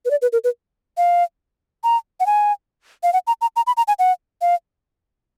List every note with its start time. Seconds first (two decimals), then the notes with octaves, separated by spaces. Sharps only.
0.05 B4
0.11 D5
0.22 B4
0.33 A#4
0.44 B4
0.97 F5
1.84 A#5
2.20 F#5
2.26 G#5
3.03 F5
3.13 F#5
3.27 A#5
3.41 A#5
3.56 A#5
3.67 B5
3.77 A#5
3.88 G#5
3.99 F#5
4.41 F5